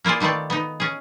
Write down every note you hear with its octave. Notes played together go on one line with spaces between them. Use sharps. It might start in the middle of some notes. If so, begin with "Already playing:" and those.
A#3 E4 F4 G#4 D5
D#3 A3 B3 C4 D5
B3 D#4
C#4 G#4